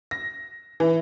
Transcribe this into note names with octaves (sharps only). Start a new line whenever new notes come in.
A#6
E3